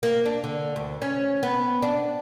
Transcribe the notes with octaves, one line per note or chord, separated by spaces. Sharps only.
A#3
D4
D3
D2
C#4
B3
D4